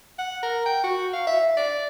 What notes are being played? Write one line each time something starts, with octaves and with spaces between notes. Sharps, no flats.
F#5
A#4
G5
F#4
F5
E5
D5